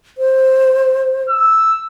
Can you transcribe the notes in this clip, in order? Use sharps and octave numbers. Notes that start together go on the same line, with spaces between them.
C5
E6